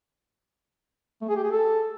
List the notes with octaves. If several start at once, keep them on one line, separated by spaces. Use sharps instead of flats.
A3
G#4
G4
G#4
A4